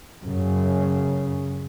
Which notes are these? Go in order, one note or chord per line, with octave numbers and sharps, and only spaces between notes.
F#2 C#3